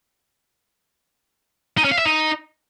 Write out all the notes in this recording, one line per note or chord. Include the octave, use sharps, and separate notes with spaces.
D#4
C#4
F5
E5
D#4